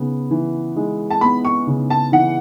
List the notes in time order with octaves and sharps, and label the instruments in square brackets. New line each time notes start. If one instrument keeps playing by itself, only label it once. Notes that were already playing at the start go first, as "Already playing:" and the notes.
Already playing: [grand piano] C#3 B3
E3
G#3
[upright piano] A5
[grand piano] B3 [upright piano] B5
[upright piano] C#6
[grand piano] C#3
[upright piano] A5
[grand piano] E3 [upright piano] F#5